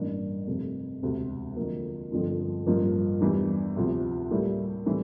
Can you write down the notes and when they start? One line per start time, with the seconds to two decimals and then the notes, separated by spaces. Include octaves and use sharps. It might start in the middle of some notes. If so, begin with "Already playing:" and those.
Already playing: A1 G2 E3 A#3 D4
0.47 F1 F2 C3
1.02 E1 D2 C3
1.56 F2 D3 F3 A#3
2.12 G1 F2 D3 F3
2.67 A1 G2 F3 A#3
3.21 E2 E3 G3 D4
3.76 D2 C3 F3
4.31 A2 G3 A#3 E4
4.86 A2 E3 G3 C4